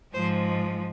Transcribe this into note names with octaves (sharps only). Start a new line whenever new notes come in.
G#2 F3 G#3 C5